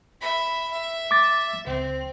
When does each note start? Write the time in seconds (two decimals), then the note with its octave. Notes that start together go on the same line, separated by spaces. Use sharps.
0.21 E5 B5
0.72 E5
1.11 D6 A6
1.67 C#2 C4